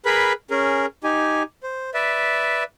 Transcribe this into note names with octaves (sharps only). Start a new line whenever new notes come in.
G#4 A#4 B4 B5
C#4 G#4 A#4
D#4 G4 G#5
C5
B4 D5 E5